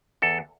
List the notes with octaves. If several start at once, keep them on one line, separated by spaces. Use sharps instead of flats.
E2 A4